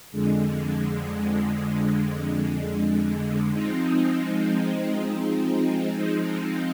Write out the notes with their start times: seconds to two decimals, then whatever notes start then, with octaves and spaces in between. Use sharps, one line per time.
0.12 F2 D3 G#3
3.51 F3 G#3 C4 D#4